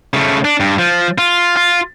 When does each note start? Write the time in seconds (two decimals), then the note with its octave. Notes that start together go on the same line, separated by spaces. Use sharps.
0.14 C#3 A3
0.45 D4
0.60 G2
0.79 F3
1.18 F4
1.57 F4